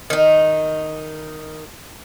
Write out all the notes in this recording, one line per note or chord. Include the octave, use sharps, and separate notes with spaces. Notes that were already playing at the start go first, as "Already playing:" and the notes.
D#3 D#4